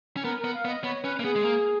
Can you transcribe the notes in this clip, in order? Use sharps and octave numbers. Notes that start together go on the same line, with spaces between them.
C#4
B3 A#4
B3 A#4
F5
B3
D#5
B3 C#5
C#4 B4
A#3
B3 G#4
G#3
A#3